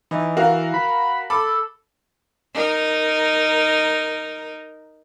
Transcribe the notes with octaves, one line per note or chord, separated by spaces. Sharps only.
E3 D#4
F#4 A#4 F5
B5
A4 B5 D6
D#4 A#4